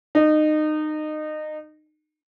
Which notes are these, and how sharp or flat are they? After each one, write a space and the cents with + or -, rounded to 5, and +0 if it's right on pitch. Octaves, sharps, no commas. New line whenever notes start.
D#4 -25